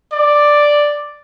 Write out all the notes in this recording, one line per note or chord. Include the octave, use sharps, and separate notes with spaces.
D5